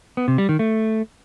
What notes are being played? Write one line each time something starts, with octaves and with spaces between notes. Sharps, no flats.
B3
C3
G3
D#3
A3